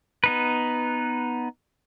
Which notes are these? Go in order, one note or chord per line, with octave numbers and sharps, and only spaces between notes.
B3 D#4 B4